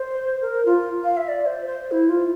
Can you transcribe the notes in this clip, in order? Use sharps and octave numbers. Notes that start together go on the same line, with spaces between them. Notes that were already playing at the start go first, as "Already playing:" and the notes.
Already playing: C5
A#4
F4
F5
E5
D5
D5
C5
C5
E4
F4